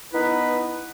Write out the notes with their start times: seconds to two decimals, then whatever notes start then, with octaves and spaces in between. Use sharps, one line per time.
0.13 B3 D#4 E4 B4